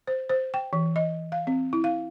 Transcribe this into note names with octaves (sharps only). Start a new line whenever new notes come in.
C5
C5
G5
E3
D#5
F5
C4
E4
F5